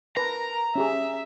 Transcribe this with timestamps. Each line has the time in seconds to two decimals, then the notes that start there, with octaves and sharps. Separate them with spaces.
0.17 A#4 B4 A5 A#5
0.75 C#4 G4 G#4 E5